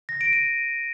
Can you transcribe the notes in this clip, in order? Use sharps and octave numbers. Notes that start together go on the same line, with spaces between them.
A#6
D7
D#7